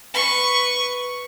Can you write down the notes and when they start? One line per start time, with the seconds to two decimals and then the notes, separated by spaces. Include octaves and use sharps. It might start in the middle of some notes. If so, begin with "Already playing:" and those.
0.14 B4 C#6